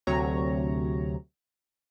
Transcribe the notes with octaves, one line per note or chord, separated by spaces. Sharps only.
D2 C3 F#3 C#5 A#5